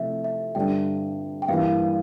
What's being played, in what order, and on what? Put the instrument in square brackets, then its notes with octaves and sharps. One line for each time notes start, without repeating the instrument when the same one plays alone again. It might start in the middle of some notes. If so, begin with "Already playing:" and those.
Already playing: [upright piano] C3 F3 A3 E4 [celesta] E5
[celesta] E5
[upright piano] G2 D3 G3 D4 [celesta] G5
[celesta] G5
[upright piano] G2 E3 G3 A#3 E4 [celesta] F5